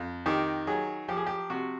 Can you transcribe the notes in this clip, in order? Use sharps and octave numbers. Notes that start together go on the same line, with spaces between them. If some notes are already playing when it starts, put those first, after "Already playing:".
Already playing: F2
D#3 G4
F#3 G#4
F3 G4
G#4
G4
C3 F#4